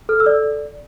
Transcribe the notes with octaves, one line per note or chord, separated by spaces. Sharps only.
A4 F6
E6
D5